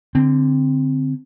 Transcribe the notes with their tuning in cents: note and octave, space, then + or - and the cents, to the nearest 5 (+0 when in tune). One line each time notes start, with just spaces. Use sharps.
D3 +0 C4 +0